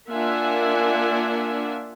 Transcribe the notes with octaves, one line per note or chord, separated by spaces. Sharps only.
A#3 D4 F4 E5 F#5 G#5